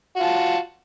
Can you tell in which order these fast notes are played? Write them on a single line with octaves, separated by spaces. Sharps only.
F#4 F4 A5